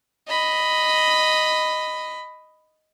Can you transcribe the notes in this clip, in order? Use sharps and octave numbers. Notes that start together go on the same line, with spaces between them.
D#5 B5